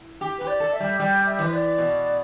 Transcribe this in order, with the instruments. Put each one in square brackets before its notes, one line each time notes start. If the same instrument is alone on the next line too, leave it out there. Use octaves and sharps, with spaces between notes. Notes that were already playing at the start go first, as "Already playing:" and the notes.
Already playing: [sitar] E4
G4
[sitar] G4 [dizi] B4
[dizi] D5
[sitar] A4
[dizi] E5
[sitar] G3
[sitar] G3 [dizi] G5
[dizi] E5
[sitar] E3 [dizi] B4
[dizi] D5
[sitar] B2